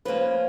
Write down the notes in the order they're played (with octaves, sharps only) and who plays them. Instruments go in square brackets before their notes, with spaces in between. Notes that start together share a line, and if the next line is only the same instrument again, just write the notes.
[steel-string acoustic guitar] F3 A#3 C#4 B4